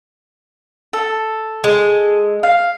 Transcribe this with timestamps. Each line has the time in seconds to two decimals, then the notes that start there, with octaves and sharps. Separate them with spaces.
0.93 A4
1.64 G#3
2.43 F5